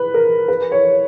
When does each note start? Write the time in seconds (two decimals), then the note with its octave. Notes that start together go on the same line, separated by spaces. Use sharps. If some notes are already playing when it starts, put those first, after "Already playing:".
Already playing: B4
0.14 A#4
0.48 B4
0.72 C#5